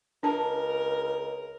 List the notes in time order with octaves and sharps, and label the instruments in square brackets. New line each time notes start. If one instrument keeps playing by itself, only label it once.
[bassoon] C#2 [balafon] D4 A5 [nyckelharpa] A#4